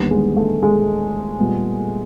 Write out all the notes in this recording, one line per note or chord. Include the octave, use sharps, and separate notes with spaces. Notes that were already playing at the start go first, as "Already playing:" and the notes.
Already playing: D#2 D3 G3 B3
G#3
A3
G#3
A#2 G3 B3